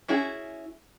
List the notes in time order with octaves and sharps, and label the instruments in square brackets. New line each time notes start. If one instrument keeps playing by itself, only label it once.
[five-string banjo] C#4 E4 F#4 G#4